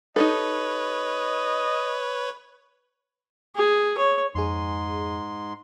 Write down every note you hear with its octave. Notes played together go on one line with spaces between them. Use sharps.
D#4 G4 A4 B4 C#5 D#5
G#4
C#5
F2 G#2 G#4 C6